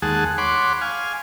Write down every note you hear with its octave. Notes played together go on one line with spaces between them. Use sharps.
D#2 G#3 G#4 F#5 A5
C#5 F#5 B5 C6 D6
F5 G#5